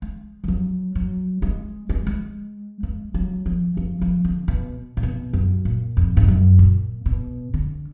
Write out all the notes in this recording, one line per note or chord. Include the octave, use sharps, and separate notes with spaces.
G#3
F3
F#3
F#3
G#3
G#3
G#3
G#3
F#3
F3
F3
F3
D3
B2
A#2
B2
F#2
A#2
F2
G#2
F#2
A#2
B2
D3